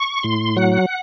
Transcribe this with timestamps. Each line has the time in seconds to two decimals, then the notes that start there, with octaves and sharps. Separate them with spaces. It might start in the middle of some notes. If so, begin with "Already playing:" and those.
Already playing: C#6
0.23 A2 C6
0.56 F#3 F#5